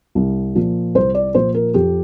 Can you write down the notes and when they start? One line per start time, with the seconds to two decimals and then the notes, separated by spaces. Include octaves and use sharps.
0.15 C2
0.55 A#2 F3
0.95 C2 C5
1.14 D5
1.35 A#2 F3 C5
1.54 A#4
1.74 F2 G4